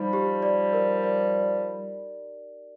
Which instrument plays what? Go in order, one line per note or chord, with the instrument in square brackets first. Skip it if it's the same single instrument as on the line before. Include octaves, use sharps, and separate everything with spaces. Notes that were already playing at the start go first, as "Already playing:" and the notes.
Already playing: [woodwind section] F3 G3 [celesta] D#4
[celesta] G4
D5
A#4
D5